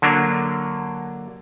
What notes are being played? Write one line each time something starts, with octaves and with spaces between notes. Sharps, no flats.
D3 F#3 A#3 D4